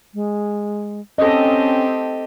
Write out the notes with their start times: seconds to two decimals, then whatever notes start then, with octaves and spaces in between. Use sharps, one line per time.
0.14 G#3
1.18 C4 C#4 G4 A4 D#5